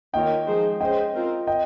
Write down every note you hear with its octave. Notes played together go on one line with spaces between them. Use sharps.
D#3 A#3 F4 A#4 C#5 D#5 G5
F3 G#3 D#4 G#4 C5
C#4 G#4 C5 D#5 G5
C4 F4 A#4
D#5 G5